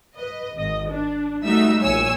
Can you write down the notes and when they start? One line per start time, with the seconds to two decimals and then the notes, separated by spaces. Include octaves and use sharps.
0.17 B4 D#5
0.55 G#1 D#5
0.90 D4
1.44 G3 A3 D#4 F#4 E5 E6
1.82 A#1 A#2 C#5 G#5 E6